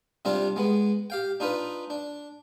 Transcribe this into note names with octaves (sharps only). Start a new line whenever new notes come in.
C3 G3 C4 D4 F4 D5
G#3 B3
G4 F5 G5
D4 D#4 F4 B4
D4